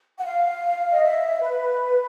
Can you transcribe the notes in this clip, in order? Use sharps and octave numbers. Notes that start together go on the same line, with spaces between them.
F#5
F5
D#5
E5
B4